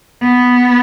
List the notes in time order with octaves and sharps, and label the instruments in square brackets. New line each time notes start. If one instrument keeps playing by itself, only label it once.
[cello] B3